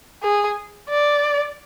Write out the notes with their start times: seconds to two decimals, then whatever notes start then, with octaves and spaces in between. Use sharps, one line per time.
0.23 G#4
0.90 D5